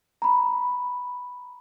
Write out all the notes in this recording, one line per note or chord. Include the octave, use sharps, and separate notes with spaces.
A#5 B5